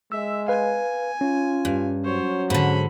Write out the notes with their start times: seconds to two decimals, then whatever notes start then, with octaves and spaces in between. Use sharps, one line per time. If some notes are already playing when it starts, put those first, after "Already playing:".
0.12 G#3 E5 E6
0.48 B4 F5 G#5
1.21 C#4 F4
1.65 G2
2.04 F#3 C5 C#5
2.50 G#2 D3 B5